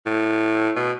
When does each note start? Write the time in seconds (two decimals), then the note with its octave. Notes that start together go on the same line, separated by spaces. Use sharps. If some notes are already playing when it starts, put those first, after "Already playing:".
0.06 A2
0.76 B2